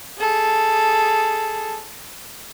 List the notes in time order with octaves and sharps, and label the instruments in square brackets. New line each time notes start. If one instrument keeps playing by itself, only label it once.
[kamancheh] G#4 A4